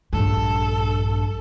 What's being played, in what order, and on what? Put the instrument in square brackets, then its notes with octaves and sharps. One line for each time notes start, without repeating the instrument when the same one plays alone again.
[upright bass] A#1 G2 [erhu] A4